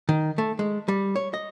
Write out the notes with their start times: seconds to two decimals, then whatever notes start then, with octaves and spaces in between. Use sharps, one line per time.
0.09 D#3
0.38 A3
0.59 G#3
0.88 G3
1.16 C#5
1.34 D#5